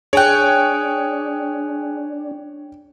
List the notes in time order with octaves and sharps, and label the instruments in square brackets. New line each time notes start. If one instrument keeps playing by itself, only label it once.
[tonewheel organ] D4 [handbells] G#4 G#5 F#6 [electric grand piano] C#5 G5